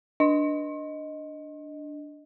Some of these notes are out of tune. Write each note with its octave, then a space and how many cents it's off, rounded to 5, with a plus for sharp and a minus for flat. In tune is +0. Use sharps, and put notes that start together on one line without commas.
D4 +0 D#5 +0